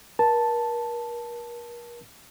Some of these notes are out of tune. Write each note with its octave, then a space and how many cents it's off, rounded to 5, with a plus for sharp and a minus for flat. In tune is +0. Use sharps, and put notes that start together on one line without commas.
A#4 +35 A5 +0